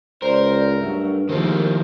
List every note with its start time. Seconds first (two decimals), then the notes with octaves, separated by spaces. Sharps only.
0.22 C#2 A#4 C5 D5
0.81 G2 F#3 A3 D4
1.29 D#2 D#3 F3 G#3 A3 C4 A#4